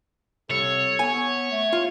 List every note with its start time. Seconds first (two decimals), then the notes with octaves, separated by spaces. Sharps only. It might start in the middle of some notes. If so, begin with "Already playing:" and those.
0.50 C2 A4 C#5
0.99 B3 G#5
1.51 A3
1.73 F4